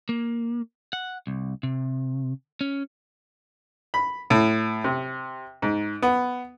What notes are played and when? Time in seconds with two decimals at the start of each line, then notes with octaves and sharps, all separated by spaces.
0.09 A#3
0.93 F#5
1.27 C2
1.63 C3
2.61 C#4
3.94 B5
4.30 A2
4.84 C3
5.62 G#2
6.02 B3